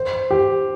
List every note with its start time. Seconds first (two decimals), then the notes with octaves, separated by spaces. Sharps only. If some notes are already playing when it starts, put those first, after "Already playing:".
Already playing: C5
0.31 G4